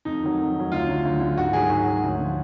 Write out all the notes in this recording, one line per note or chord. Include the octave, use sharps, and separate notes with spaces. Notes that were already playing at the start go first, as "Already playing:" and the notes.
F2 D#4
D#3 F#3
F2
D#3 F#3
D2 F4
D3 F#3
D2
D3 F#3
G#2 F#4
D#3 F#3 G#4
G#2 F#4
D#3 F#3
D2
D3 F3